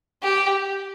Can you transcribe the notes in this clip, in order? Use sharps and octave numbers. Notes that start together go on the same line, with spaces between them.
G4